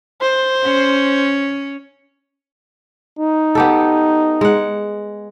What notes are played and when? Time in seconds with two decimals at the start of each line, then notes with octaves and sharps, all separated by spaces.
0.21 C5
0.63 C#4
3.19 D#4
3.55 B3 G4 A4
4.41 G#3 F#5